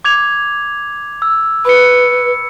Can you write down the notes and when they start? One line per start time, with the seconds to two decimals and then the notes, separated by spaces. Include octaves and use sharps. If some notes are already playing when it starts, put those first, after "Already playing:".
0.05 D6 G#6 F7
1.22 E6
1.65 B4 B5 C#7